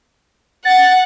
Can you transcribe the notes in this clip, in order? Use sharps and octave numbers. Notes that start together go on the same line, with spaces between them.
F#5 A6